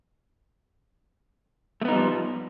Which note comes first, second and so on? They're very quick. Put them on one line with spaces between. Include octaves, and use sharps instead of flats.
A3 B3 D#4 G3 F3